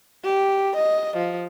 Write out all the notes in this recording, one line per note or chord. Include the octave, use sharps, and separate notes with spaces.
G4
D#5
F3